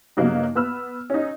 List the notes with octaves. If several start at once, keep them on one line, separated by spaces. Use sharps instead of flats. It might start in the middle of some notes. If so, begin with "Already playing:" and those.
G2 C#3 F#3 A#3 B3 D#4
B3 B4 E6 F6
C#4 D#4